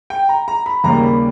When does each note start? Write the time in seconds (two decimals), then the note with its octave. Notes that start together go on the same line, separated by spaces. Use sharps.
0.10 G5
0.29 A#5
0.48 A#5
0.66 B5
0.84 D#2 C#3 G3 A#3 A#5
1.03 B5